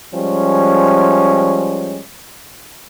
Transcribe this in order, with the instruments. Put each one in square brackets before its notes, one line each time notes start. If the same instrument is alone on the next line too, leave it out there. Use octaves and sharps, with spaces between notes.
[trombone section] F3 G3 G#3 C#4